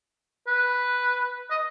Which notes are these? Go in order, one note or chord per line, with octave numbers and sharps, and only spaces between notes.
B4
D#5